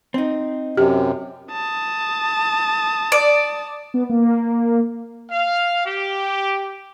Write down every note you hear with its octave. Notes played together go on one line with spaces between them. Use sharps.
C4 D#4
F#2 C3 G4
A5 D#6
D5
B3
A#3
F5
G4